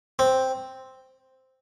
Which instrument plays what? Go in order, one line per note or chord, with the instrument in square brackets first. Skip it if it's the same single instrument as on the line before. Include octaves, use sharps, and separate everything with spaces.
[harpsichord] C4